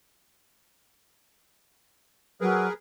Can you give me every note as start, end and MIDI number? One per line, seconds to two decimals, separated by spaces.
2.41 2.67 54
2.41 2.73 68
2.41 2.73 70
2.41 2.73 71